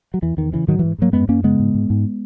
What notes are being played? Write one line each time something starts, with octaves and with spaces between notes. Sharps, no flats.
F#3
E2 E3
E2 D#3
C#3 E3
G#2 D#3 F#3
G#2 E3
G#2 F#3 A#3
F#2 G#3 B3
F#2 A#3 C#4
C#3 G#3 B3
G#2
G#2
G#2